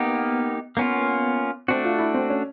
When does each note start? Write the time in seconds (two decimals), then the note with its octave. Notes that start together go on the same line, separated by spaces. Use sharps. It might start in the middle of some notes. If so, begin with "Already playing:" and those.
Already playing: A#3 B3 D#4 G4
0.77 A#3 B3 C#4 F4
1.68 A3 C4 D4 F#4
1.85 F4
1.99 E4
2.14 C4
2.30 C#4